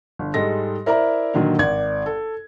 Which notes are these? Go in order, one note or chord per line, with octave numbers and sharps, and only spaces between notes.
G1
G#2 G3 G#3 A4 A#6
E4 A#4 C5 D5 E5 A#5
A#2 D3 D#3 F#3
G#1 D5 G#6
A4